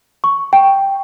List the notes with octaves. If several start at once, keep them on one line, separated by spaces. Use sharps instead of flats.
C#6
G5